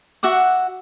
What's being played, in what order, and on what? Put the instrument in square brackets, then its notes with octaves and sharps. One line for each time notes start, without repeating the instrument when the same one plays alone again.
[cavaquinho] F#4 E5 F#5 D6